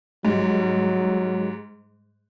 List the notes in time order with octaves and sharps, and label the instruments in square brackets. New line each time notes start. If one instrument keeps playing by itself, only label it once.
[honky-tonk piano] G#2 G3 [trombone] F#3